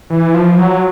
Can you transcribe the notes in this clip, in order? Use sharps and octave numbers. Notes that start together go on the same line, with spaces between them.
E3
F3
F#3